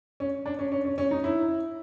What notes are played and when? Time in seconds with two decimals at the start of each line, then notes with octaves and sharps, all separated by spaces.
0.20 C#4
0.46 D4
0.59 C#4
0.72 C#4
0.85 C#4
0.98 C#4
1.11 D#4
1.24 E4